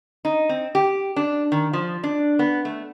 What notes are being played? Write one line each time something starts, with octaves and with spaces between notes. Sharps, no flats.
D#4
C4
G4
D4
D#3
F3
D4
B3
A3